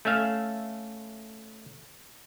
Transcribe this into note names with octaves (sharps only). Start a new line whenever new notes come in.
A3 C#4 E5 F5